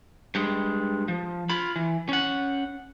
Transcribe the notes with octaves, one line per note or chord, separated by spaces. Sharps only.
G2 G#3
F3
F4 B5
E3
C#4 F#5